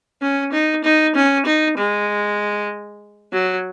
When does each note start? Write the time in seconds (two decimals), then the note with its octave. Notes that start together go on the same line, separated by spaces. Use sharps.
0.22 C#4
0.53 D#4
0.85 D#4
1.16 C#4
1.46 D#4
1.78 G#3
3.33 F#3